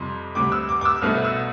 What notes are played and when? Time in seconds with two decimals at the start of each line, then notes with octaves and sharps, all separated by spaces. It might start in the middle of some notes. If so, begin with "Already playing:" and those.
Already playing: F2 C3 G3 C6
0.35 D2 C3 G3 D6
0.52 E6
0.69 D6
0.81 D6
0.85 E6
1.02 C2 B2 A3 F6
1.24 E6